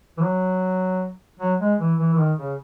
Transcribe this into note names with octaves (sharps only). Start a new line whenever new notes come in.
E3
F#3
F#3
G#3
E3
E3
E3
D#3
C#3